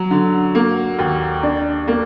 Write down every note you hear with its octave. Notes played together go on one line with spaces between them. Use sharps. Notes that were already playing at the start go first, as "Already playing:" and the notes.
Already playing: F#3
D3
A#3
D#2
D4
A#3